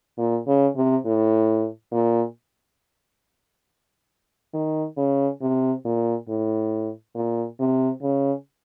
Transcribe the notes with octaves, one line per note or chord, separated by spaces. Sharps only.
A#2
C#3
C3
A2
A#2
D#3
C#3
C3
A#2
A2
A#2
C3
C#3